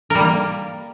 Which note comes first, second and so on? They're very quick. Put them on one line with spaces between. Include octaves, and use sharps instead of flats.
A#4 G3 A#3